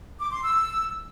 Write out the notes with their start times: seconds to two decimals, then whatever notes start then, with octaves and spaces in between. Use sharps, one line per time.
0.20 D6
0.32 C6
0.43 E6